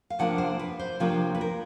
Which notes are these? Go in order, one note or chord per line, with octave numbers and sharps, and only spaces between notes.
F5
C3 F3 A#3 D4 F4 F#5
C5
B4
C5
C3 F3 A#3 D4 F4 C#5
B4
A#4